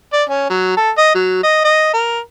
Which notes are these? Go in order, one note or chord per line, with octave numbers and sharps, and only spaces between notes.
D5
C#4
F#3
A4
D#5
F#3
D#5
D#5
A#4